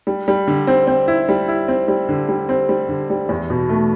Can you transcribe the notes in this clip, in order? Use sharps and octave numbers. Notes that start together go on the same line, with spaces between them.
G3
G3
D3
C4
C4
E4
G3
E4
C4
G3
D3
G3
C4
G3
D3
G3
E2
B2
A3